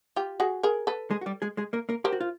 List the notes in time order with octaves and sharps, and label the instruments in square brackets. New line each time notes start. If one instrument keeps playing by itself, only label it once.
[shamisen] F4 G4
F#4 G#4
G#4 A#4
A4 B4
[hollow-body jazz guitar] G#3 G#4
F#4
G3 G4
G#3 G#4
G#3 G#4
A#3 A#4
A#3 A#4
[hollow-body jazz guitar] G4 [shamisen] A#4 C5
[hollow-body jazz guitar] F#4
F4